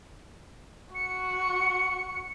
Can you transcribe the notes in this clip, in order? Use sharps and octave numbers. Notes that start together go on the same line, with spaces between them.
F#4 C#7